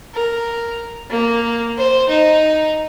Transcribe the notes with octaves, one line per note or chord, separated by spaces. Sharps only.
A#4
A#3
C5
D#4